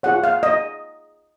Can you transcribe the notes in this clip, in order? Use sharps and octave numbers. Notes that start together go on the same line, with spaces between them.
F4 G#4 C#5 F#5
F5
D#5